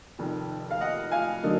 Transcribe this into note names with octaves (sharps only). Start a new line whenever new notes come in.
F1 F2 D#3
F5
D#5 F#5
F5 G#5
D3 F#3 A#3 D#4